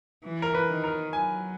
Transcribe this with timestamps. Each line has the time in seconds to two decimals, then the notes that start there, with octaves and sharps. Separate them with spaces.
0.24 E3
0.42 A#4
0.55 B4
0.69 D#3
0.84 A#4
1.13 F#3 G#5